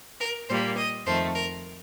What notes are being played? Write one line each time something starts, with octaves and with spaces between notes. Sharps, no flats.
A#4
A#2 G3 A#3 C5
D#5
F2 D#3 A3 C5
A#4